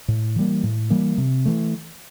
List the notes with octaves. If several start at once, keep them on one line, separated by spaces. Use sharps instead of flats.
A2
E3 G3 A#3
A2
E3 G3 A#3
C3
E3 A3